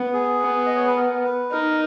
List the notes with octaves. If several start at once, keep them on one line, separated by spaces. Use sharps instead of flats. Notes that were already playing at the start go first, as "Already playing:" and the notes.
Already playing: B3
G#4
B3
D#5
C#5
B4
A#4
B4
D#4 A#4